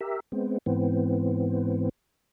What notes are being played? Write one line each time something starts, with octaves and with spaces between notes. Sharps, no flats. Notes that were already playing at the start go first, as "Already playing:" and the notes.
G4 A#4 E5
G#3 B3 C4
G#2 E3 B3 C4